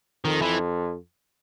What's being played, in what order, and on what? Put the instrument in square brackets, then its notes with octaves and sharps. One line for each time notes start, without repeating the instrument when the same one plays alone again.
[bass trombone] F2 [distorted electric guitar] D#3
[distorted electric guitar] E3